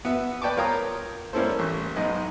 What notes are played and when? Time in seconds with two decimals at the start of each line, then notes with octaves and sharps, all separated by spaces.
0.05 B3 F#4 E5
0.42 B4 D5 G5 A5 C#6 D6
0.57 F4 A#4 C#5 G5 A#5 D#6
1.33 G3 A#3 C#4 E4 A4 C5
1.59 A1 C#6
1.96 B1 G#2 D#5